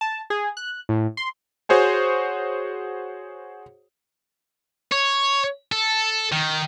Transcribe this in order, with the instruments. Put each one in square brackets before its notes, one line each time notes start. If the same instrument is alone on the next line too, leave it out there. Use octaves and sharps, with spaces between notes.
[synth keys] A5
G#4
F#6
A2
C6
[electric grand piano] F#4 G#4 C5 C#5 G#5
[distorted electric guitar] C#5
A4
D#3